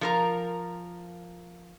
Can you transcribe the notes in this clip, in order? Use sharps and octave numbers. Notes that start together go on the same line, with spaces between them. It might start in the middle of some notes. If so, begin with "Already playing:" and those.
F3 A#4 A#5